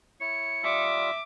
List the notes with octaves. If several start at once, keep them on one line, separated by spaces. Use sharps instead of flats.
E4 C#5 C#7
G3 F4 E5 D6 D#6